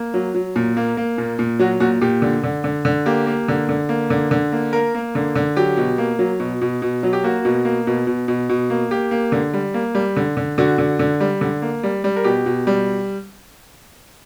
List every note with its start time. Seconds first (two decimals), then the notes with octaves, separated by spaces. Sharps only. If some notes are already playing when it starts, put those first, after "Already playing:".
Already playing: A#3
0.14 F#3
0.35 F#3
0.56 A#2
0.77 A#3
0.97 A#3
1.18 A#2
1.39 A#2
1.59 F#3 F#4
1.80 A#2 F#4
2.01 A#2 G4
2.22 D3
2.44 D3
2.64 D3
2.85 D3
3.06 A#3 G4
3.27 A#3
3.48 D3
3.69 D3
3.89 A#3
4.10 D3
4.31 D3
4.52 A#3
4.73 A#3 A#4
4.95 A#3
5.15 D3
5.36 D3
5.57 F#3 G4
5.77 B2
5.98 A#3
6.19 F#3
6.40 B2
6.61 B2
6.82 B2
7.03 F#3
7.13 G4
7.24 A#3 F#4
7.45 B2
7.65 A#3
7.87 B2
8.07 B2
8.28 B2
8.49 B2
8.70 A#3
8.91 A#3 G4
9.11 A#3
9.32 D3
9.54 G3
9.74 A#3
9.95 G3
10.17 D3
10.37 D3
10.58 D3 F#4
10.78 D3
10.99 D3
11.20 G3
11.41 D3
11.62 A#3
11.83 G3
12.04 G3
12.16 A#4
12.24 B2 G4
12.46 B2
12.67 G3